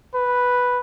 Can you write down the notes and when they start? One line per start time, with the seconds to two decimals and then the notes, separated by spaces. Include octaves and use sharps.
0.15 B4